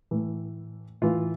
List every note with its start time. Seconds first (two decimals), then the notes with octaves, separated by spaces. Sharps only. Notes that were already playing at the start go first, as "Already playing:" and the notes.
0.11 A2 E3
1.02 A2 E3 F4